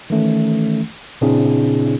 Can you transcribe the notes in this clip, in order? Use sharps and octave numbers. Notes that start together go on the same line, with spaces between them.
D#3 E3 A3 C#4
A#2 C#3 C4 D4 E4 G#4